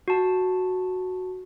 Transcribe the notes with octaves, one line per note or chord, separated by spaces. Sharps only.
F#4 A5